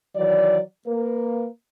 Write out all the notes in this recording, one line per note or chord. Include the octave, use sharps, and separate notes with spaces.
D#3 E3 F#3 D5
A#3 A#4 B4